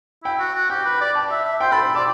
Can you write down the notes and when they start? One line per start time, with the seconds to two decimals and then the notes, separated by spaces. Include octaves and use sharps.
0.24 E4 G5
0.40 F#4
0.55 F#4
0.70 G4 G5
0.86 B4
1.01 D5
1.15 A5
1.31 E5
1.45 E5
1.60 C5 G5
1.72 A4 B5
1.83 C6
1.95 D5 E6